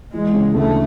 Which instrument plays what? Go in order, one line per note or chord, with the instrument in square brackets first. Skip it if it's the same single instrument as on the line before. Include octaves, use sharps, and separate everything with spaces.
[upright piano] E3 [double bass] G#3
[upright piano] C#3
[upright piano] D2 [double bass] A3